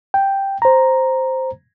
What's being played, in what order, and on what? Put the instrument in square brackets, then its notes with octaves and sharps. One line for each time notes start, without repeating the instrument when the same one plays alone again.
[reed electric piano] G5
C5 A#5